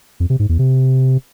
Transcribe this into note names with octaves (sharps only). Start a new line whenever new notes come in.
F2
C3
G#2
E2
C3